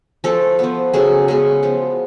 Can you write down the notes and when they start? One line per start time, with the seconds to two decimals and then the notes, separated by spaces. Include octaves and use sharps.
0.24 F3 A3 A4
0.59 F3 B3
0.93 C#3 F#3 A3 G#4
1.28 C#3 G#3 B3 G#4
1.63 F3 B3